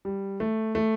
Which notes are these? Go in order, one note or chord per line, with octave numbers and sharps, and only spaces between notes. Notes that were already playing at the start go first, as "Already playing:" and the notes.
G3
A3
A3